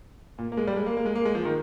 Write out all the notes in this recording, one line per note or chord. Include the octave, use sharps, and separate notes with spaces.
A#2
A#3
G#3
G3
G#3
A#3
A#3
G#3
A#3
G#3
F3
D#3